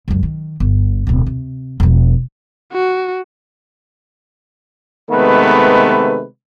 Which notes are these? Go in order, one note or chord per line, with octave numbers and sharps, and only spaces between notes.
C#2 F#2
D#3
G1
D1 B2
C3
E1 F3
F#4
C3 D#3 G#3 A3 B3 B4